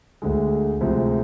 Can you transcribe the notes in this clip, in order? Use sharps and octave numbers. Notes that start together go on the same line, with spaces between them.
D2 D3 G#3
D2 C3 F3 G#3